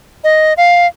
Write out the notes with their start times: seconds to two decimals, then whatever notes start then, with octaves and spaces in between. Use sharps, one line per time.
0.24 D#5
0.57 F5